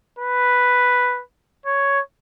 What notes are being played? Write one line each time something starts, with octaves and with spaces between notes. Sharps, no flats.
B4
C#5